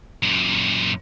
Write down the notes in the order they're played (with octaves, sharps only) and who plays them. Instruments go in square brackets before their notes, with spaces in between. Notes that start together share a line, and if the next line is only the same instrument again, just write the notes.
[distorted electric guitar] F#2 A#2